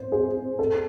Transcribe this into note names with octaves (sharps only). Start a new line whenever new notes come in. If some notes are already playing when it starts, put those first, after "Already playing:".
Already playing: C5
G#4
A4